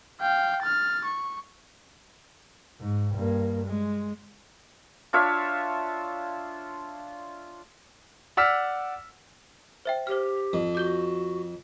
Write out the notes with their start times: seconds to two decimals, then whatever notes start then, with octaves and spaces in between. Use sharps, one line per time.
0.21 F5 G5
0.62 F6 A6
1.05 C#6
2.81 G#2
3.14 G2 A#3
3.65 G#3
5.13 D4 F4 C#5 E5
8.37 D5 F#5 E6 F6 B6
9.85 C5 E5 G5
10.07 G4 C5 F6
10.53 F2
10.75 F#4 D6 G6 G7